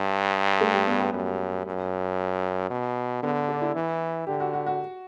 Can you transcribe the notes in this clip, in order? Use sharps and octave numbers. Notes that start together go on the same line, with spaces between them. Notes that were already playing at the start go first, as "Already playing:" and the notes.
Already playing: G2
A3
G3
B3
B3
F#2
F#2
B2
D3 B3
D4
E4
E3
D3 G4
F#4
F#4
F#4